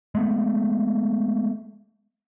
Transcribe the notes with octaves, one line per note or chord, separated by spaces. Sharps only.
G#3 A3 B3